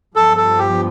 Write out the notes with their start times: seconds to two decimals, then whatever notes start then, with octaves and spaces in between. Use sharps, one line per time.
0.16 G2 F3 B3 A4
0.37 A4
0.59 G4